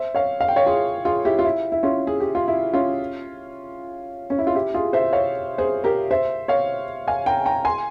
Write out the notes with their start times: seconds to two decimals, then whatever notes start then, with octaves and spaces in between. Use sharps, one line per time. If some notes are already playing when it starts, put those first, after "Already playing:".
Already playing: C5 E5
0.15 C#5 F5
0.41 F5
0.48 G5
0.56 C#5 F5
0.66 F4 G#4
1.05 F4 G#4
1.25 E4 G4
1.39 F4
1.44 E4
1.72 E4
1.83 C#4 F4
2.07 G#4
2.20 G4
2.35 F4
2.48 E4
2.74 C#4 F4
4.30 C#4
4.39 E4
4.47 F4
4.55 E4 G4
4.74 F4 G#4
4.93 C5 E5
5.13 C#5 F5
5.58 G#4 C5
5.84 G4 A#4
6.11 C5 E5
6.48 C#5 F5
7.08 F5 G#5
7.26 G5 A#5
7.46 G5 A#5
7.65 G#5 C6